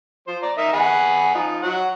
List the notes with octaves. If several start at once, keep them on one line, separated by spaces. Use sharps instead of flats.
F3 C5
D5 A#5
D#4 A#4 E5
G#4 F#5 B5
F3 D#4
F#3 F#5